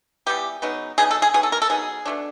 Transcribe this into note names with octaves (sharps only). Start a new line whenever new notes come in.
E3 G3 B3 D#4 G4
C#3 F#3 B3 D#4
C#3 F#3 B3 D#4 G#4
A4
G#4
F#3 B3 D#4 G#4
A4
A#4
A4
F#3 B3 D#4 G#4
B2 F#3 A3 D4